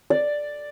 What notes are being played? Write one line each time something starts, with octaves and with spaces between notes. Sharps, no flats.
D5